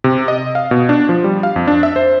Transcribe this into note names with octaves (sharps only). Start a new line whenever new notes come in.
C3
D#5
F5
B2
D4
F3
G3
F5
F2
D4
E5
C5